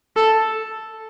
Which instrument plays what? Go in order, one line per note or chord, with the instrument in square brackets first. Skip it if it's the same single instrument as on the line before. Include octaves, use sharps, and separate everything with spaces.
[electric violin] A4